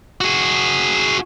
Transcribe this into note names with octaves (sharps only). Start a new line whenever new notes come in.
F#4 G#4